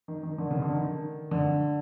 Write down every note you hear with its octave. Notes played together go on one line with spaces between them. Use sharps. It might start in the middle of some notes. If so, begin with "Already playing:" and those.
D#3
D#3
D3
C#3
D3
D#3
D3